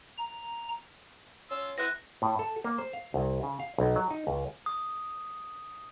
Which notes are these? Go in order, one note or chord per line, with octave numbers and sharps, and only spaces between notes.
A#5
C#4 F4 E6
E3 G#3 C4 F#4 F#6 A#6
A2
A4
A#3
C5
F5
C2
C#3
F5
B1
F#3
D#4
C#2
D#6